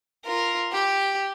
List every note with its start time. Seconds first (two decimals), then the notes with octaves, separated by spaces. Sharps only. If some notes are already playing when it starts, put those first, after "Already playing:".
0.25 F4 A#4
0.73 G4